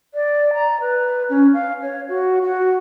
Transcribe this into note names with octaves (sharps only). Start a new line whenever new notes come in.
D5
A#5
B4
C#4
F5
C#5
F#4
F#4